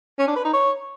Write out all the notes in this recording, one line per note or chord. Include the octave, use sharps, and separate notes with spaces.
C#4
D4
B4
D#4
C#5